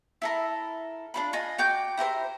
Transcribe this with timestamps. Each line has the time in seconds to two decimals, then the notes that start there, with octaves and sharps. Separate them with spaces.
0.22 E4 A4 A#4
1.14 D4 F4 B5
1.33 F4 D#5 G#5
1.58 F#4 G5 D6 G6
1.97 E4 G4 A#4 C5